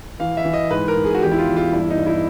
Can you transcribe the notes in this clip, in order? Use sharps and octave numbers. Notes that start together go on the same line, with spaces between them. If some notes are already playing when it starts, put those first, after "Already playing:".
E3 F5
E5
E3
D#5
G#2 B4
A#4
G#2
G#4
F#4
E2 G4
E4
F4
E2
F4
G2 E4
D#4
G2
E4